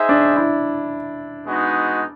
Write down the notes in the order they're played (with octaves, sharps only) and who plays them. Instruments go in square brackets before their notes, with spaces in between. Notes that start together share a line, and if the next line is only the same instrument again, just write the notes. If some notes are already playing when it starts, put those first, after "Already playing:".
Already playing: [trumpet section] D#4 G#4 C5 E5
[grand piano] D4
E4
[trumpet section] G#3 B3 D#4 F#4